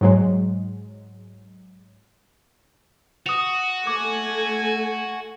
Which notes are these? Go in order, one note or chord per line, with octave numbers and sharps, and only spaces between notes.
G#2 F#3 G#3
F#4 D#6 F7
A3 G#5 D6